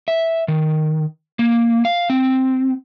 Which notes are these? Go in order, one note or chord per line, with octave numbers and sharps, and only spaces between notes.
E5
D#3
A#3
F5
C4